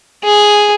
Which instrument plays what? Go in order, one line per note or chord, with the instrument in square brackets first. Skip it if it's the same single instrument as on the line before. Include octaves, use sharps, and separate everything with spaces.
[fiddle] G#4